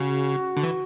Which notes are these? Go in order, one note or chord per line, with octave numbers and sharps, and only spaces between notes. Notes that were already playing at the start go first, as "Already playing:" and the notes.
Already playing: C#3 F#4
D3
E3